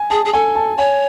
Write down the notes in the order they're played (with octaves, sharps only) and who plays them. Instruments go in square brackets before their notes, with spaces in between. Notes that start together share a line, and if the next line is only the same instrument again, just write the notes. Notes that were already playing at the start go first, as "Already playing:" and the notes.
Already playing: [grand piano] G#5
[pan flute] G#4 [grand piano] A5
[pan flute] G#4
[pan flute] A4 [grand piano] G#5
[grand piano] A5
[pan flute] C#5 [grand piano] G#5